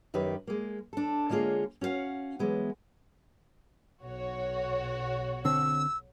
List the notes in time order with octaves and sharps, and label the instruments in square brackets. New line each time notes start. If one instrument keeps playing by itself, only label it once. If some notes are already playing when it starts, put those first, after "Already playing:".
[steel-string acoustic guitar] F#2 D#3 G4 B4
G#3 A#3
D4 A4
D3 G#3 A#3 F4 G#4 C#5
C#4 F#4 C5 F5 F#5
E3 F#3 G#3 B3
[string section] B1 F#4 C#5
[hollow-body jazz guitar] D3 C4 [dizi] E6